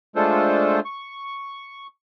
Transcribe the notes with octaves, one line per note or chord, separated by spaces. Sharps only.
G#3 A3 D4 F4 A4 C5
C#6